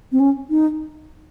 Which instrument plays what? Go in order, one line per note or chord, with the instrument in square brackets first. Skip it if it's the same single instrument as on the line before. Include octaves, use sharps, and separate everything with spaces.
[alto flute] C4
C#4
D#4